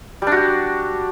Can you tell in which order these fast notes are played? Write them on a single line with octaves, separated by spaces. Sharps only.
G3 D4 F#4 G4